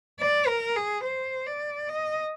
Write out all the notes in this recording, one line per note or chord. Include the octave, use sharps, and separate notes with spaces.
D5
A#4
G#4
C5
D5
D#5